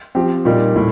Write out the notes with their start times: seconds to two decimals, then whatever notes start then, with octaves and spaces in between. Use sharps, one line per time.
0.15 F3 C4 G4
0.45 A#2 G3 A#3 D#4
0.76 A2